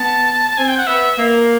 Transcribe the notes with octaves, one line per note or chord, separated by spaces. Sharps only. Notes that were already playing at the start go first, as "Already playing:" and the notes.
Already playing: B3 A5
C4 G#5
G5
F#5
B3 E5
A#3